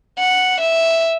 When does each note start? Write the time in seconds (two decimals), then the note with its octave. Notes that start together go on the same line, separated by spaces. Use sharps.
0.19 F#5
0.61 E5